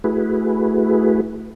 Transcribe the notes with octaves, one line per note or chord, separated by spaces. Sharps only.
A3 E4 F#4 G#4 B4